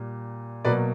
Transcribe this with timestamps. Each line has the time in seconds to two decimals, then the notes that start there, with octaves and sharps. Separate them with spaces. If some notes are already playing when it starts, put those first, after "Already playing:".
Already playing: A#2 G3
0.65 B2 F#3 A#3 B4 D5